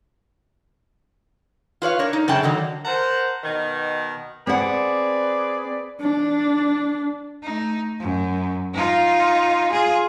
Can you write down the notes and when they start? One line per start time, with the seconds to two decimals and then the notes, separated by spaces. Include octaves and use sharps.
1.82 F4 B4 C#5 F5
1.99 D4 A#4 C#5
2.13 D#4
2.28 F#2 C#3 C#5 G5 A5
2.43 D3 D#3 F#3
2.84 A#4 C5 F#5 A5 A#5
3.44 B2 D#3
4.47 C4 G#4 B4 D5 F#5
6.01 D4
7.43 A3 D#4
8.00 F#2
8.74 D#4 F4
9.72 F4 G#4